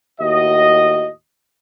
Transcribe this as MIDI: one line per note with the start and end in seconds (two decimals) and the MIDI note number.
0.21 1.09 39
0.21 1.09 45
0.21 1.09 66
0.21 1.09 75